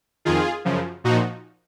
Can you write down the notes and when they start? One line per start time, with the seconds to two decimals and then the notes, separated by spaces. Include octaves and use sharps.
0.25 F2 D#3 F4 G#4
0.65 F#2 C#3 F3
1.04 A#2 F3 D#4 F#4